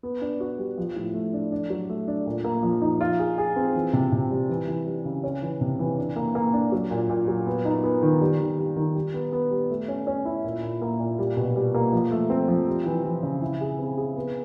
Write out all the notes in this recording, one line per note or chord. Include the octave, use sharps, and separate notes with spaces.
B3
D4
F#4
G3
F3
A2
A3
D4
D4
F#3
A3
D4
A#2
A#3
F3
D#4
F4
G#4
G#4
C4
E3
C3
C3
G3
E3
E3
G3
C#3
C#4
E3
C3
E3
D4
A#3
A#3
D4
F#3
A#2
A#2
F#3
B3
D#4
B3
D#3
G3
D#3
G3
D#3
G3
B3
B3
G3
A3
C#4
C#4
E4
A#2
A#2
A#3
A#2
G3
B2
G3
A#3
F3
A3
C4
F3
G3
E3
E3
C#3
E4
G#4
C4
G#4
B3